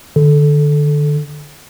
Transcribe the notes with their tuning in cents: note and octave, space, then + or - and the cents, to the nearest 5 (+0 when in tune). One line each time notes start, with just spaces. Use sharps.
D3 +25 A4 -15